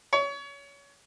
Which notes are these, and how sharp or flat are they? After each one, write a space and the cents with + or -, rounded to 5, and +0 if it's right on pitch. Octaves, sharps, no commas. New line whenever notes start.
C#5 +25